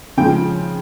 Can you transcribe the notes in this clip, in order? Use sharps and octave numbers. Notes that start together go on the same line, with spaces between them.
C#3 F3 G#3 G5